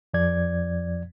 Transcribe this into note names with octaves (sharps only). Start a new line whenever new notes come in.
F2 F3 D5 G#6